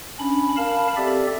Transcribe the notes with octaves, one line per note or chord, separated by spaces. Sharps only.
C#4 D4 B5
A#4 F5 A5 B5
C4 G4 A4 D5 E5